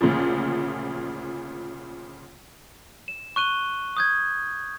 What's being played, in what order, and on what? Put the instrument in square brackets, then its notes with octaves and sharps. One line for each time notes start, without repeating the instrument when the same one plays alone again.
[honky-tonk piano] D2 A#2 C#3 F3
[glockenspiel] E7
C#6 F#6 D#7 G7
D#6 G6 G#6